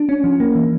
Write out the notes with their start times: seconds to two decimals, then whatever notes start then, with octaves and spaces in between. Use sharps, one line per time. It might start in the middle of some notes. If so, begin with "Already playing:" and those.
Already playing: D4
0.09 C#4
0.24 F3
0.40 A#3
0.55 E3